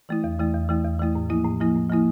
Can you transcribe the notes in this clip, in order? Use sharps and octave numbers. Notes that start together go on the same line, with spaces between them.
E3 A3 E4
E2
E3 A3 E4
E2
E3 A3 E4
E2
E3 A3 E4
A2
F3 A#3 E4
A2
F3 A#3 E4
A2
F3 A#3 E4